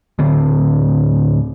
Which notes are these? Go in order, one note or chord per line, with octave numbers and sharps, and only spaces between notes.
D1 D3 C4